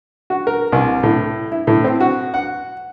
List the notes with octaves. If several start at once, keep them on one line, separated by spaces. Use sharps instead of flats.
F#4
A#4
C2
A2
E4
A2
C4
F#4
F#5